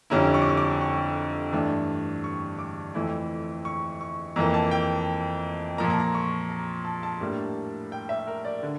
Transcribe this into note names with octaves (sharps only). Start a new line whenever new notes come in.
F2 D3 G3 C#4 E4 A#5
C#6
D6
C#6
D6
C#6
G2 E3 A3 D4
C#6
D6
F2 E3 A3 E4
C#6
C#6
F2 E3 A#3 A#5
A5
G5
A#2 F3 A#3 A#5
A5
A#5
C#6
A#5
A5
A5
A2 G3 A#3 D4
G5
E5
A#4
D5
D3